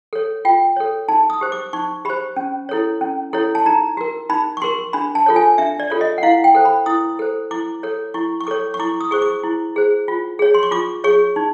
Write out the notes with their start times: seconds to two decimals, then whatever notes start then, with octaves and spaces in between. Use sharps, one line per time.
0.13 A4 C#5
0.45 F4 G5
0.77 A4 C#5
1.08 D#4 A5
1.30 D#6
1.41 G4 C5
1.52 D6
1.73 D#4 C#6
2.05 G4 C5 B5
2.37 C#4
2.69 E4 A4 C#5
3.01 C#4
3.33 E4 A4 C#5
3.55 A5
3.66 D#4 A#5
3.97 F#4 A#4
4.30 D#4 B5
4.57 C#6
4.62 F#4 A#4 C6
4.93 D4 B5
5.15 A5
5.26 F4 A4 C#5
5.36 G#5
5.58 D4 E5
5.80 D5
5.90 F4 A4 C#5
6.01 D#5
6.18 F#5
6.23 E4 F5
6.44 G5
6.55 A4 C5
6.65 B5
6.86 E4 D#6
7.19 A4 C5
7.51 E4 D6
7.83 A4 C#5
8.14 E4 C#6
8.41 C#6
8.47 A4 C#5 D6
8.74 C#6
8.79 E4 D6
9.01 D#6
9.11 G#4 C5 C#6
9.22 D6
9.43 E4
9.76 G#4 C5
10.08 F4
10.39 G#4 C#5
10.55 C6
10.63 C#6
10.71 F4 D6
11.04 G#4 C#5 C#6
11.36 D#4